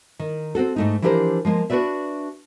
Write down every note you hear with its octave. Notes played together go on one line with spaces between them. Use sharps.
D#3
C4 C#4 F#4 A4
G#2 A3 D#4
E3 F3 D4 G4 A#4 C5
F3 G#3 A#3
D4 F#4 G4 B4 D5 E5